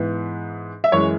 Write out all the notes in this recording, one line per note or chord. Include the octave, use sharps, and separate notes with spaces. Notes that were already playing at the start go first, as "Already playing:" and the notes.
Already playing: G#2 E3 B3
E5
F#2 E3 G#3 C#5